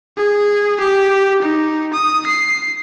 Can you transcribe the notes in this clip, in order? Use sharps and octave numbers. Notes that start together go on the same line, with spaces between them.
G#4
G4
D#4
D#6
C7